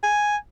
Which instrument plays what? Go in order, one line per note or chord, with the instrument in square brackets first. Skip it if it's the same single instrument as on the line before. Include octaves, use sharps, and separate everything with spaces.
[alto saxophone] G#5